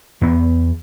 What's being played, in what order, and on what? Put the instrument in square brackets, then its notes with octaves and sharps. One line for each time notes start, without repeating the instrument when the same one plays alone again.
[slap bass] E2 B3